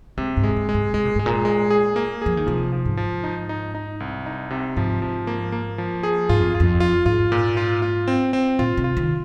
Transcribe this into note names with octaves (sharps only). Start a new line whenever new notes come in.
C3 G#3
G#2
G#3
C3
G#3
G#2
C3 G#3
A#2
G#2 G#3
A#2
G#3
G#4
A#3
F3 G#4
D#3
C3 F3
F3
G#2
F3
D#4
D#4
D#4
C2
D#4
C3
G#2 F3
F3
A#3
A#3
F3
G#4
G#2 F4
F2
F4
F2
F4
G#2 F4
A#2
F4
F4
C4
C4
A#2 F4
C3
F4
D#3